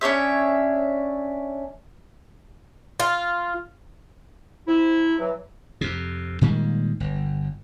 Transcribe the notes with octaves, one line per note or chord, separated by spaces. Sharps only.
C#4 D4 C#5 E5
F4
C3 E4
E3 F#3
F2 C3
A#2 D#3 G3 G#3
G1